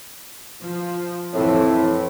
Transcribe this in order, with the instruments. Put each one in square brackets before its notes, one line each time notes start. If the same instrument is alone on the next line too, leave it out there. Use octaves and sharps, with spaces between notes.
[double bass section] F3
[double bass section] F2 E3 C4 [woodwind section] A2